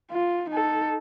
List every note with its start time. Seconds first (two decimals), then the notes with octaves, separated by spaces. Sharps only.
0.11 F4
0.50 D#4 A4